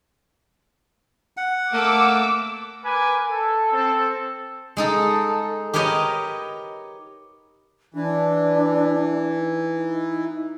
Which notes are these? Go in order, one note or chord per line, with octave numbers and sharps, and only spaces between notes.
F#5
A3 A#3 D6 E6
A#4 B4 G#5 D6
A4
C4 A4
G#3 D#4 A4
G4 A#4 B4 C#5 D#5
E3 D4
D#4